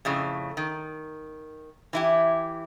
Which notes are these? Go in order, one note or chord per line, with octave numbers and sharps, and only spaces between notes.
F2 A2 C#3
D#3
E3 E4 G4